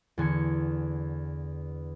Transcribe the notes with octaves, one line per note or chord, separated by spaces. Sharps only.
E2 D3 G#5 C#7